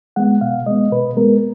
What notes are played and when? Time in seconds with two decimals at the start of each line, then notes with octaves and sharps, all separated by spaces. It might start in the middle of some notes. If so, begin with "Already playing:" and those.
0.16 G#3 B3 F#5
0.41 B2 F5
0.66 G#3 B3 D#5
0.92 B2 B4
1.17 G#3 B3 A#4